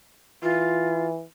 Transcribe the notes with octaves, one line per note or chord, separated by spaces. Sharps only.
E3 F4